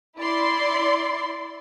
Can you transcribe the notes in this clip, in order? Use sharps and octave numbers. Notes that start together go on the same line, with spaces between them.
E4 D5 C6